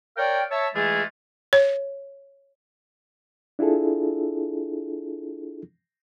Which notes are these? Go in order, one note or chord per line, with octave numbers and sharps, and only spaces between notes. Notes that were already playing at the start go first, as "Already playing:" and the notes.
A#4 C#5 D5 F5 G5
C#5 E5 A5
E3 G#3 A3 E4 F4 G#4
C#5
D4 E4 F4 G#4 A4